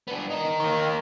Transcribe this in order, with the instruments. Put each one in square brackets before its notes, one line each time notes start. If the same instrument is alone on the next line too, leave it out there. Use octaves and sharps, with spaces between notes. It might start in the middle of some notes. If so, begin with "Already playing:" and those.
[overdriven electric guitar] B3 D4
D#4 A#4
[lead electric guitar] D#3 A#3